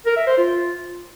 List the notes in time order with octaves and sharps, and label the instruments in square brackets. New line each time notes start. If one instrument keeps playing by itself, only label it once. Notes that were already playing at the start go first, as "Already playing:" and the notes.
[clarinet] A#4
E5
C5
F4